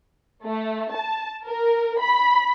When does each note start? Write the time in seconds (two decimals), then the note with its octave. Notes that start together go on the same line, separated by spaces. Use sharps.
0.46 A3
0.93 A5
1.46 A#4
2.01 B5